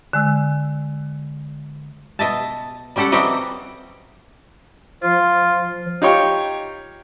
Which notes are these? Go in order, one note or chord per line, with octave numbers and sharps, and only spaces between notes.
D3 G#3 E6
B2 D#5 E5 A5
G3 C#4 G4 A4 F#5
E3 F#3 G3 C4 G4 D#5
F3 F4
D#4 F4 G4 C#5 G5 C#6